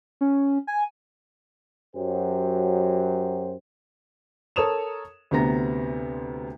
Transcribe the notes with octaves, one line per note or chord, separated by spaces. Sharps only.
C#4
G#5
F#2 F#3 G4 C5
A4 A#4 C#5 D#6 E7 F7
D2 C3 B3 A#5 A#6